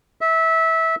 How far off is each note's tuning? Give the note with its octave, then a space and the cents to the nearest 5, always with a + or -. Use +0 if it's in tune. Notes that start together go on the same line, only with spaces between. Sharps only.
E5 -20